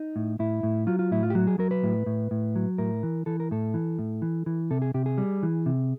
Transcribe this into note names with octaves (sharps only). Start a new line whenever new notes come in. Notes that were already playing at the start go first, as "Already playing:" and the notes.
Already playing: D#4
A2
A2 E4
A2
F#3 F4
F4
A2 E4
F4
G4
F#3 F#4
G#4
F#3 A#4
B4
A2
A2
A2
F#3
A2 A#4
E3
E3 A4
A#4
A2 A4
E3
A2
E3
E3
C3 A4
G#4
C3 G4
G#4
G3
E3
C3